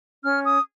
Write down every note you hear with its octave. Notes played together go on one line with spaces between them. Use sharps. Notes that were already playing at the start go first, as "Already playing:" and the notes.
C#4 F6
D#6